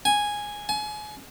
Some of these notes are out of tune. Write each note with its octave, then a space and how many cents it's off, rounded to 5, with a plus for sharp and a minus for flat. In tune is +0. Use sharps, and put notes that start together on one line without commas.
G#5 -5
G#5 +30